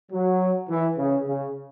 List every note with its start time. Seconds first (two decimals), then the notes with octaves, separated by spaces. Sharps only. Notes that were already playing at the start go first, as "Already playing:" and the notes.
0.12 F#3
0.69 E3
0.98 C#3
1.27 C#3